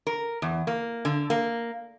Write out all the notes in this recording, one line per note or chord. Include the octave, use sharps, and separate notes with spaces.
A#4
E2
A#3
D3
A#3